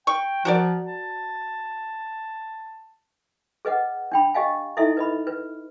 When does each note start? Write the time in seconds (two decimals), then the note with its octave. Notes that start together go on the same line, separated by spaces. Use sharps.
0.07 G5 C#6
0.45 F3 F#4 A#4 D5
0.86 A5
3.65 G#4 B4 D#5 F#5
4.12 D4 G5 B5
4.34 G4 D#5 F5 G#5
4.77 D#4 E4 A4 D#5 E5
4.97 B4 D#5 B5
5.27 B4